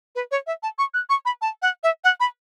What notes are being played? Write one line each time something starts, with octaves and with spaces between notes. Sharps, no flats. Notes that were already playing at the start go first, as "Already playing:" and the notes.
B4
C#5
E5
A5
C#6
F#6
C#6
B5
A5
F#5
E5
F#5
B5